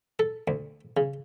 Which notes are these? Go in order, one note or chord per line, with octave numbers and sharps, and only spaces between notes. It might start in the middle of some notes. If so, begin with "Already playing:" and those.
A4
D2
C#3